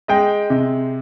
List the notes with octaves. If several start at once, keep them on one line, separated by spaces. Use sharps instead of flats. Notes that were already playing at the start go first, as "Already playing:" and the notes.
G#3 D#5 G5
C3